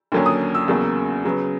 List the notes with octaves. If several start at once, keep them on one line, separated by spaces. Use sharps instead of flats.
D#2 D3 F#3 A#3 C#4
D#6
E6
E2 C#3 F#3 A#3
C#3 F#3 B3